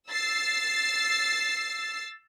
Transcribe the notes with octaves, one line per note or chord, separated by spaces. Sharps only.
E6 A6 C7